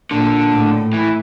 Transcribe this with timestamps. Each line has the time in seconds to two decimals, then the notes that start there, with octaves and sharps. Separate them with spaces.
0.11 A#2 D3
0.52 A2
0.93 E3